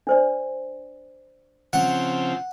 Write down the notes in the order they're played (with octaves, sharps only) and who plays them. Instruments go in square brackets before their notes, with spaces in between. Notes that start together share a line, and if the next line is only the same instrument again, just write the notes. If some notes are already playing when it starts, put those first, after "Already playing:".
[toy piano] D4 C5 D5
[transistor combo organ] C#3 F3 C4 [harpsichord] F#5